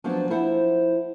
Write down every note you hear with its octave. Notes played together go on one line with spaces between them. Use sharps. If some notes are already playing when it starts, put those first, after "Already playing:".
F3 F#3 B3 D4 C5
F3 E4 C5 F#5